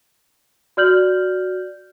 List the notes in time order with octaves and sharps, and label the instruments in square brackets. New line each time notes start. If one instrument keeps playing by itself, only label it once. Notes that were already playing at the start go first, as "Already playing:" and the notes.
[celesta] F#4 D5 F6 G6 F#7